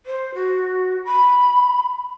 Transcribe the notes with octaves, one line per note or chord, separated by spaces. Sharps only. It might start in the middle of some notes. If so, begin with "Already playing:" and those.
C5
F#4
B5